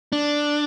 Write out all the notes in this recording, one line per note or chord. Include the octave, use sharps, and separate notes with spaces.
D4